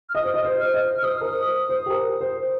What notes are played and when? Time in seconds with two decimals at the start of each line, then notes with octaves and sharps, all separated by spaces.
0.09 F6
0.15 D#5 D#6
0.24 C5
0.34 D#5
0.45 C5
0.60 F6
0.74 D#5
0.98 F6
1.03 C5 D#6
1.21 A#4
1.25 C5
1.69 C5
1.86 G4
1.90 A#4
2.20 C5